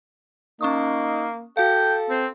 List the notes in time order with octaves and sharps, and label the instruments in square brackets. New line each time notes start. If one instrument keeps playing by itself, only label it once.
[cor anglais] A#3 [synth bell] C#4 C#6 D#6 [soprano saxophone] D#4
[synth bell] F#4 F5 [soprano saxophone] A4 [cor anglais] G5
[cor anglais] C4